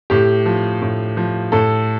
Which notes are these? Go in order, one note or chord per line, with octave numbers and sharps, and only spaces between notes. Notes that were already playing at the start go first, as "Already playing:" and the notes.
A2 G4
F3
A2
F3
A2 A4